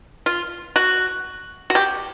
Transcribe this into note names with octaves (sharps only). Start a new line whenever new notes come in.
F4
F#4
F#4
G4